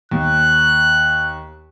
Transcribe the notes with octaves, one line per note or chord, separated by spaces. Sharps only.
D#2 F#6